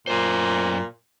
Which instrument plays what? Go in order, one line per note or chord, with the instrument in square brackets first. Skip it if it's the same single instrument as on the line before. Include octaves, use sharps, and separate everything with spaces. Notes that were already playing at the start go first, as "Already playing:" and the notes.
[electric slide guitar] F#2 C5 [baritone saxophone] A#2